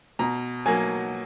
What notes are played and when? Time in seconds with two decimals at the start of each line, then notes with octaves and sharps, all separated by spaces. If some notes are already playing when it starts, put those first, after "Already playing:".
0.19 B2 A#5
0.66 F#3 A#3 G#5